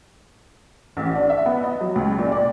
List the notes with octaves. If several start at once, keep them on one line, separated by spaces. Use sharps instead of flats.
A1
D4
E5
B3
D#5
F#3
C#2
A#2
D5